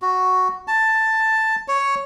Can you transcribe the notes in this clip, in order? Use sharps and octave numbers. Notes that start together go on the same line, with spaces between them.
F#4
A5
C#5